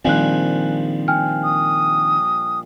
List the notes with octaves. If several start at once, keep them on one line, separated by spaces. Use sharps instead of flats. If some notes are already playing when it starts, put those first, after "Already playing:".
A#1 D#3 F3 G3 C4 G#5 F#6
G5 G#5 F6
D#6